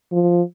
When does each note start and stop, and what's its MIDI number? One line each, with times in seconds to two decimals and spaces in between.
0.12 0.42 53